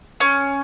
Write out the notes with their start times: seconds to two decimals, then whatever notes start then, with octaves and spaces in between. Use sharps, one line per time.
0.20 C#4